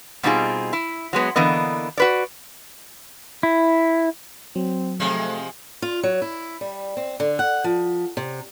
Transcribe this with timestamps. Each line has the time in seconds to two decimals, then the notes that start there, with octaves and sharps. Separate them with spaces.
0.23 B2 G3 C4 D#4 F4 G#4
0.73 E4
1.13 F#3 G#3 B3
1.36 D3 E3 A#3 B3 D#5
1.97 F#4 B4 D5
3.43 E4
4.56 F#3 C4
5.00 C3 F3 G#3 A3
5.82 F4
6.03 F#3
6.22 E4
6.61 G3
6.97 C4
7.20 D3
7.39 F#5
7.64 F3
8.17 C3